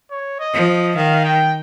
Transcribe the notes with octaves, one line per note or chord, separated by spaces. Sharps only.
C#5
D#5
F3
D#5
D#3 F5
G5